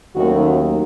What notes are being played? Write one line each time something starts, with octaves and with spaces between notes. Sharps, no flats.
D#2 D#3 F#3 A3 C#4 F#4